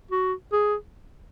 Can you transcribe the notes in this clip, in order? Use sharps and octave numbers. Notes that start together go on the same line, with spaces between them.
F#4
G#4